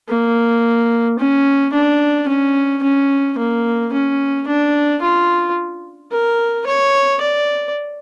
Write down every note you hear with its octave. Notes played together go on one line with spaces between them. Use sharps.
A#3
C#4
D4
C#4
C#4
A#3
C#4
D4
F4
A#4
C#5
D5